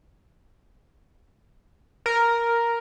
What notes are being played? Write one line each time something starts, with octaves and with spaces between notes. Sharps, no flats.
A#4